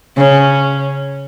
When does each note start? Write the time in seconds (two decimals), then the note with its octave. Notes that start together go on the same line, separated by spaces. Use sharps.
0.17 C#3 C#4